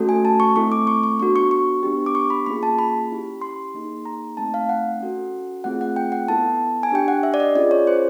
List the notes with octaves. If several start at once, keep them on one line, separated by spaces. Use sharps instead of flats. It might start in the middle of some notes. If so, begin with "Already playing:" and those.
Already playing: A3 C#4 F#4 A4
G#5
A5
C#6
A3 C4 E4 A4 C#6
D6
C#6
C#6
B3 D4 F#4 A4 C#6
C#6
C#6
B3 D4 G4
D6
C#6
B5
A#3 C#4 F4 G#4 B5
A5
B5
C#4 E4 G4
C6
A#3 D#4 G#4
A#5
A3 C4 D#4 A5
F5
F#5
C#4 F#4 A4
A3 C4 F4 G#4 F#5
F#5
G5
F#5
B3 E4 A4 A5
G#5
D4 G4 G5
F#5
E5
D5
D#5
C#4 F4 G#4 D5
C#5
C5